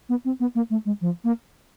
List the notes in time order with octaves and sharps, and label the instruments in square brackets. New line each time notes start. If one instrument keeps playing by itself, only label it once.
[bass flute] B3
C4
B3
A#3
A3
G#3
F3
A#3